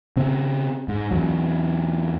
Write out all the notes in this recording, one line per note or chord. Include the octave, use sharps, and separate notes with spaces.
C#3 C4
G#2
E2 F#3